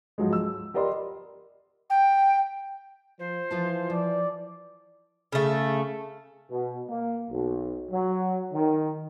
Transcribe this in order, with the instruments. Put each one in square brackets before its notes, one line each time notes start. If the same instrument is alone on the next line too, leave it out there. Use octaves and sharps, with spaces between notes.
[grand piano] G#2 F3 F#3 G#3
E6
G4 A#4 D5 D#5 B5 C6
[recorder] G5
[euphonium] F3 [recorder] C5
[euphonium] E3 [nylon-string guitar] F3 F4 A5
[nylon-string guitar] F3 [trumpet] D5
[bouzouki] C#3 A3
[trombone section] B2
A#3
B1
F#3
D#3